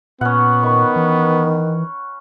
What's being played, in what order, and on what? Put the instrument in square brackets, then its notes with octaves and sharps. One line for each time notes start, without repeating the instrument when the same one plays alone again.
[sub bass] A#2 [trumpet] B3 [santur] C#4 F#5
[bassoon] D#3 [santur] B5 C#6
[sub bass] E3